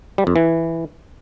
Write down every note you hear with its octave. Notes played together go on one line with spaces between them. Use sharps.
G3
F2
E3